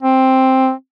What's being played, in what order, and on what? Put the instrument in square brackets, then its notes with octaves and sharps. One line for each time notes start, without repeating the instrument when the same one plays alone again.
[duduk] C4